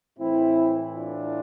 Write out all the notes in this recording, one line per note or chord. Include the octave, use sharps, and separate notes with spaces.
A2 E3 C4 E4
D4 F4